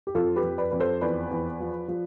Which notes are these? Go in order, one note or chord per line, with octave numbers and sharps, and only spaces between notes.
G4
F2 F4 A4
G4 B4
F2
B4 D5
F2 B4
A4 C5
E2 B4 D5
E2
F3
F3